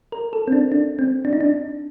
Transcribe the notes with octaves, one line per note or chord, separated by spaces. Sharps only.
A#4
A4
C4
D4
D4
C4
D4
D#4
D4